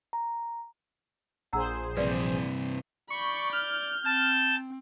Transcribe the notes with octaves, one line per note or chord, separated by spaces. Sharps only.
A#5
A#1 G#4 C5 F#5 A#5 E6
G2 C3 B4 D5 F5
D5 B5 C#6 G6
F6 G6
C4 A5 G6